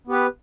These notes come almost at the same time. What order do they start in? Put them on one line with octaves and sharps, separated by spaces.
B3 G4 B4